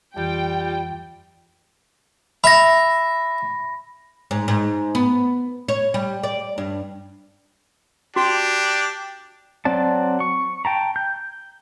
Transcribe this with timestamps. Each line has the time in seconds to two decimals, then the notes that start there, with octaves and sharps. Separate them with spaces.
0.16 F2 E3 G3 F4 G5 G6
2.44 E5 B5 A#6
4.31 G#2
4.48 G#2
4.95 B3
5.68 C#5
5.94 G3
6.23 D5
6.58 G2
8.16 D4 F#4 G4
9.65 F#3 C4 D5 A5
10.20 C#6
10.65 G5 A5 A#5
10.96 G6